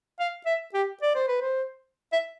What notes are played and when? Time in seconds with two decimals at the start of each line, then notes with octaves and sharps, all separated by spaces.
0.20 F5
0.46 E5
0.74 G4
1.02 D5
1.15 C5
1.28 B4
1.41 C5
2.12 E5